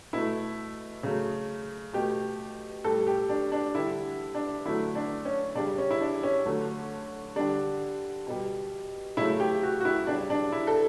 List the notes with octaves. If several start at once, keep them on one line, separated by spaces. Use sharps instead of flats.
B2 A3 E4
C#3 F#3 A3
B2 A3 G4
A2 G3 A4
G4
D4
D4
D3 G3 E4
D4
D3 F#3 A3 E4
D4
C#4
C#3 G3 D4
C#4
E4
D4
C#4
D3 F#3 A3
D3 G3 D4
B2 G3
C#3 F#3 A3 E4
G4
F#4
F#4
E4
C#3 G3 D4
D4
E4
A4